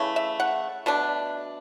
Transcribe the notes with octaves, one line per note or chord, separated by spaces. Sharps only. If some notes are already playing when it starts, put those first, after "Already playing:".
Already playing: C#3 E3 A3
E5
F#5
B2 A3 D4